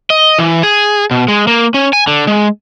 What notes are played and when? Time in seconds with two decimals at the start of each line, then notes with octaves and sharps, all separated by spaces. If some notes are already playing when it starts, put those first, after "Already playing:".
0.10 D#5
0.39 E3
0.63 G#4
1.11 B2
1.28 G#3
1.47 A#3
1.74 C#4
1.93 G#5
2.07 D3
2.27 G#3